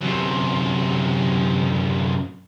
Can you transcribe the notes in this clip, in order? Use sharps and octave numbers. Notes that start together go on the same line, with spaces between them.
F#2 C3